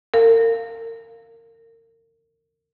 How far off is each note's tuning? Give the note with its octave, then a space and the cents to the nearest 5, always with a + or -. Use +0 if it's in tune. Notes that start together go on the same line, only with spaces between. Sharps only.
A#4 -35 F5 +5